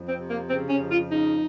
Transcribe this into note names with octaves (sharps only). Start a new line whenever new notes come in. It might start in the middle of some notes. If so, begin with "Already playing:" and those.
Already playing: F2
C4
C3
A#3
C#3 C4
C#4
F2
F4
C#3 D#4